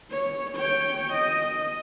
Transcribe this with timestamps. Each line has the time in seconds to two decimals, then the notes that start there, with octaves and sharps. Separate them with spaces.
0.11 C#5
0.56 C#5 G5
1.13 D#5